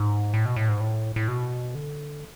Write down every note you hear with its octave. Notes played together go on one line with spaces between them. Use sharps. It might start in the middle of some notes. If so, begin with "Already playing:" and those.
Already playing: G#2
A2
B2
A2
G#2
A2
A2
B2
D3